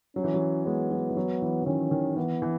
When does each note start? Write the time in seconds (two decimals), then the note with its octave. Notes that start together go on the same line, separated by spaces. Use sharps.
0.16 F#3 C#4
0.24 E3
0.34 F#3
0.66 G#3 B3
0.91 F#3
1.10 E3
1.17 F#3
1.42 E3
1.62 E3
1.66 D#3 C#4
1.91 D#3
2.16 E3 B3
2.42 E3